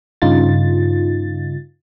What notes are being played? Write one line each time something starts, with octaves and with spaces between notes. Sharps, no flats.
G2 C#3 D#4 F4 A6